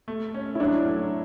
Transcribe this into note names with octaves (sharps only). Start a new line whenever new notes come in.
A3
C#4
E4
F#3 D4
A3